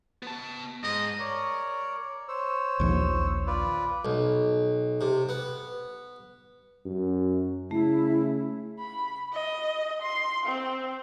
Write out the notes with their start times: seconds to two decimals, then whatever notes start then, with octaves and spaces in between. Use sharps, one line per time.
0.23 B3 A5
0.84 G#2 D#5
1.19 A#4 C#5 D5
2.28 C5 C#5 E6
2.80 A#1 D#2 F3
3.47 F4 B4 D5
4.05 B1
5.01 C3
5.29 B3
6.86 F#2
7.71 C#3 A3 E4
8.79 B5
9.33 D#5
10.02 C6
10.46 C4